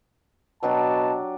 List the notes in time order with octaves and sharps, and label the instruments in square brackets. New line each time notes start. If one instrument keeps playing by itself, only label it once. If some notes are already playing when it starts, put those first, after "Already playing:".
[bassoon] B2 [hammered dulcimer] F#3 D4 G4 [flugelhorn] A5